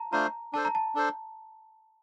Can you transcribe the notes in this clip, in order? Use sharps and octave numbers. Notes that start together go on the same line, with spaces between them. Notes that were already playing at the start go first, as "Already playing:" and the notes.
Already playing: A5 A#5
A3 D4 F4 C5 A#5
D4 A4 C5 A5
A#5
A5
D4 A4 C5